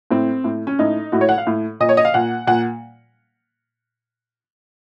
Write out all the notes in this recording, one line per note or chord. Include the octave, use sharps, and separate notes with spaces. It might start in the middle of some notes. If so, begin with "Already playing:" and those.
A2 C4
A2
C#4
A2 D#4
A2 F#4
C#5
F#5
F5
A2
A#2 D#5
C#5
D#5
F5
A#2 F#5
A#2 F#5